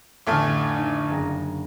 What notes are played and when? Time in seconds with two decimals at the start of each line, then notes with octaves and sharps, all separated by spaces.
0.27 A1 F2 D3 A3 F6
0.74 D#4 D#6
1.10 F#1 A#5 A#6